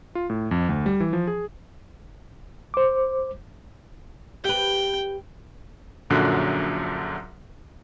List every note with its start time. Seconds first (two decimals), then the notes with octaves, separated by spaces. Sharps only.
0.15 F4
0.30 A2
0.51 F2
0.69 D2
0.86 G3
1.00 E3
1.13 F3
1.27 G#4
2.74 C5 D6
4.44 G4 B4 G5
6.10 A#1 F#2 A#2 D3 F#3 F#6